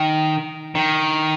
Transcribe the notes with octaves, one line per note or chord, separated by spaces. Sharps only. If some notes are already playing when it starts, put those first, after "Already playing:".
Already playing: D#3
D#3